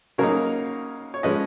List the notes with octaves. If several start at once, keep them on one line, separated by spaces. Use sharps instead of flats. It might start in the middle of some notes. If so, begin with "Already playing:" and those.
C#3 F#3 A#3 D#4 A#4 C#5
C#5
F3 G#3 C#4 B4 D#5